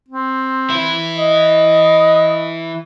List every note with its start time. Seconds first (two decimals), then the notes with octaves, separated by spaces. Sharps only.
0.08 C4
0.70 E3 E4
1.17 D#5